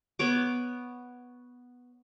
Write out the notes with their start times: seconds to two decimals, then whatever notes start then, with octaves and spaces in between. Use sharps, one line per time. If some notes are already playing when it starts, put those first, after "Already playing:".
0.19 B3 C#5 D6